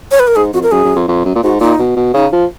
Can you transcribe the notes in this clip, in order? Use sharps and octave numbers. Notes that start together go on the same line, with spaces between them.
C#5
B4
A#4
G#2 G#4
F2 F#4
A#4
F#2 G#4
F#2
F2
F2
F#2
A#2
G#2 F#4
A#2 D#4
B2
B2
C#3 D#4
F3